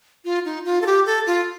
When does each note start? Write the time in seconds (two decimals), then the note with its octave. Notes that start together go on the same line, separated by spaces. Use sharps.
0.25 F4
0.45 D#4
0.65 F4
0.82 A4
0.86 G4
1.06 A4
1.27 F4